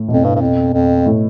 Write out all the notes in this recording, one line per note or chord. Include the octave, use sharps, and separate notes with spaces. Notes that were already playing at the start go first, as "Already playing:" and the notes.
Already playing: A2
F2 B2
G2
G2
F2
F2
A2